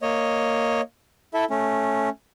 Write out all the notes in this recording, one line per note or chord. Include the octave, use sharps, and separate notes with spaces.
A#3 C#5 D#5
E4 A4 E5
A3 C#4